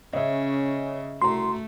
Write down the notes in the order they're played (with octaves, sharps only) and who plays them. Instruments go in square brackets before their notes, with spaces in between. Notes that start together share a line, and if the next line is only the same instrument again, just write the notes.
[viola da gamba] C#3 [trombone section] C#4 [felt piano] D#5 E5
[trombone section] C2 [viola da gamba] A3 [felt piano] F#4 A#5 [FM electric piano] C6